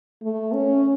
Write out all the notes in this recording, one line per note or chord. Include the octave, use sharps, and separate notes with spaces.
A3
C#4